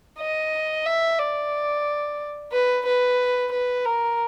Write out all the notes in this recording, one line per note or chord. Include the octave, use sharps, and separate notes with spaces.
D#5
E5
D5
B4
B4
B4
A#4